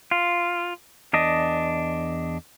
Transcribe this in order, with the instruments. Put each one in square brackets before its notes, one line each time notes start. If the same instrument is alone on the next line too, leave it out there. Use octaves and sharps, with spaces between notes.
[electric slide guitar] F4
E2 D4 D#5